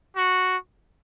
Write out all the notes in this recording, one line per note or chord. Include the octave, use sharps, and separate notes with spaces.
F#4